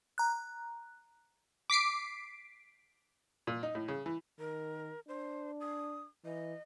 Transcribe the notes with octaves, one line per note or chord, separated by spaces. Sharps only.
A#5 F#6
D6 B6 C7 D7
A#2
D#4
A2
C#3
E3
D#3 A#4
D4 C5
D#6
E3 D#5